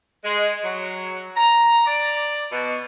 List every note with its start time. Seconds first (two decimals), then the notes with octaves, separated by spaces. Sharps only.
0.24 G#3
0.63 F#3
1.36 A#5
1.86 D5
2.51 B2